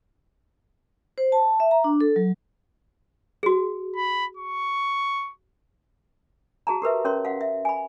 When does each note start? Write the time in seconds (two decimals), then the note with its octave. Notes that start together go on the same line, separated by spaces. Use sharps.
1.18 C5
1.32 A5
1.60 E5
1.71 A#5
1.84 D4
2.01 A4
2.16 F#3
3.43 F#4 G#4
3.96 B5
4.37 C#6
6.67 F#4 G#4 A5 A#5
6.82 G4 A#4 B4 E5
7.05 C#4 A#4 C#5 C6
7.25 F5 F#5
7.41 E5
7.65 G#5 B5